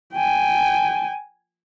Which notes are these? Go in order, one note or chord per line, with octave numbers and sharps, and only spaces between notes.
G5 G#5